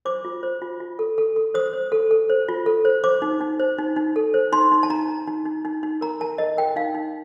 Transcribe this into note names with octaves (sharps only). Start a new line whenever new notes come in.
C5 D6
F4
C5
F4
F4
A4
A4
A4
C5 D#6
C5
A4
A4
C5
F4
A4
C5
C5 D6
D#4
D#4
C5
D#4
D#4
A4
C5
D#4 C6
D#4
A5
D#4 A#5
D#4
D#4
D#4
D#4
D#4
A#4 A#5
A#4 A5
A#4 D#5
A#4 G5
D#4 F5
D#4